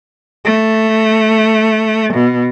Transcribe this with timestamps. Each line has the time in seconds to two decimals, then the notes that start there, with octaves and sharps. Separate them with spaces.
0.45 A3
2.13 B2